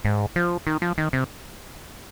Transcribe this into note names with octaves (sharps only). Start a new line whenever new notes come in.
G#2
F3
D#3
F3
D#3
C3